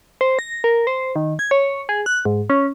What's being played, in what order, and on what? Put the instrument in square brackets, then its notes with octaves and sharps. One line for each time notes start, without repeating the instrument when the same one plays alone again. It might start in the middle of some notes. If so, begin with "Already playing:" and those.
[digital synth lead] C5
A#6
A#4
C5
D#3
G#6
C#5
G#4
F#6
G#2
C#4